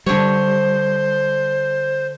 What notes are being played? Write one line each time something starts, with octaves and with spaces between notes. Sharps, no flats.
D3 G3 C5 C#5